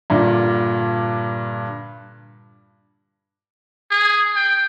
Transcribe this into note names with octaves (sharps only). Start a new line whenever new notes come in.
G2 A#2 D3
G#4
G5